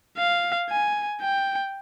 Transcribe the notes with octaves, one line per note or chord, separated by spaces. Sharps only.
F5
G#5
G5